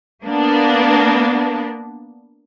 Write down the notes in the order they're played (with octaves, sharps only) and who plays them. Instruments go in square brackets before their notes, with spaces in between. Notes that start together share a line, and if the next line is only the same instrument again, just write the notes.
[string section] A#3 B3 D4